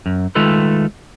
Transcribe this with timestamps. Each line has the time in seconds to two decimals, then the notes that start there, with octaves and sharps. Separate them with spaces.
0.06 F#2
0.35 D#3 G#3 A3 F4 A4 B4